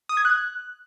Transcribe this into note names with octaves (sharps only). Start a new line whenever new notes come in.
D#6
G#6
F#6